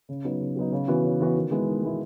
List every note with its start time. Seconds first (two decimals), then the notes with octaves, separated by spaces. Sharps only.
0.09 C#3
0.25 F#3 B3 D#4
0.40 C#3
0.56 F#3 B3 D#4
0.72 C#3
0.88 E3 B3 F#4
1.04 C#3
1.20 E3 B3 F#4
1.36 D#3
1.51 G#3 B3 E4
1.67 D#3
1.83 G#3 B3 E4